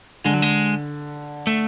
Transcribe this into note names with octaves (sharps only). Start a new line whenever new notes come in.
D3 G#3
F#3
G#3
A3